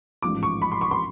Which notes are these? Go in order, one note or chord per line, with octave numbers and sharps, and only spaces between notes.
A1 G#2 F3 D6
C#6
B5
C6
C#6
C6